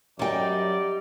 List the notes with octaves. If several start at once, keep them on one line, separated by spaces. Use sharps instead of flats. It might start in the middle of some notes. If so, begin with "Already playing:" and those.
F#2 F#3 G3 D#4 D5 G5